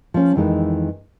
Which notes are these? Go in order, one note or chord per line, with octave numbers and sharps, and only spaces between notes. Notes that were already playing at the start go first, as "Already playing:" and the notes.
F3 C#4
F2 D#3 E3 G#3 D#4